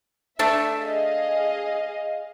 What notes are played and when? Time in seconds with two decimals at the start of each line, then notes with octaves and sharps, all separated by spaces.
0.39 A3 D4 A4 E5
0.80 G#4 D#5 F5